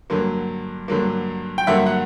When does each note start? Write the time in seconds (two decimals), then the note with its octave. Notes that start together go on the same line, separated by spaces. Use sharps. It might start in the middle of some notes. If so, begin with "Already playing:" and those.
0.10 G2 D3 F#3 A#3
0.88 G2 D3 F#3 A#3
1.58 G5
1.67 G2 D3 F#3 A#3 E5 F#5
1.86 F#5